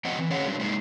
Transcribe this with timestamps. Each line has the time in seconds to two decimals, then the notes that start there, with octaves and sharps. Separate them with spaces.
0.05 F3 A3 C4 D#5 F#5
0.19 E3
0.30 D3 C#4 G#4 C#5 F5 F#5
0.46 F#3 G3 D4
0.60 G#3 A#3 D#4 G4 G#4